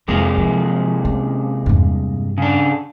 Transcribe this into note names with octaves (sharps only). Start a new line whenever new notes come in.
F2 C3 G#3 A#3
F3
C#4
E2 G2
C#3 D4